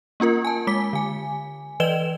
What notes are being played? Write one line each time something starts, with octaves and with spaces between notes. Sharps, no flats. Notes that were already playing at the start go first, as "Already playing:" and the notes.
A#3 C#4 F4 A#4
G#5 A5
G#3 D6 B6
D3 G#5
E3 B4 D5 D#5 E7 G7